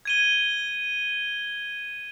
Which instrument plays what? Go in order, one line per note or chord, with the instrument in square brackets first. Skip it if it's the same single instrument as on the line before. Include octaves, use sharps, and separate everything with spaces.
[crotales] G#6 D#7 G7